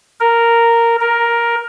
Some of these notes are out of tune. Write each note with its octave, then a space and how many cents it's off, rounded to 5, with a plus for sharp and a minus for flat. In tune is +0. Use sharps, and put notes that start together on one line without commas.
A#4 -5
A#4 +10